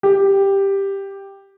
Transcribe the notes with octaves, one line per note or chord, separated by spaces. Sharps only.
G4